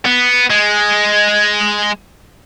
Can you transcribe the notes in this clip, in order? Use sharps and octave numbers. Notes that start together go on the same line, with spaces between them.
B3
G#3